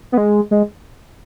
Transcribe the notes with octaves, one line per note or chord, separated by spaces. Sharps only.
B3
G#3
G#3